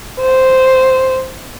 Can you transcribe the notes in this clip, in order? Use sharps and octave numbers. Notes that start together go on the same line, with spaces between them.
C5